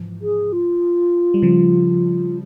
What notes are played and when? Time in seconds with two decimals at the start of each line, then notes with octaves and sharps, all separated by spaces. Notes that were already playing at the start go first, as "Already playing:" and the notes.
Already playing: G#2 C3 E3 F3
0.21 G#4
0.52 F4
1.34 G3
1.42 C#3 F3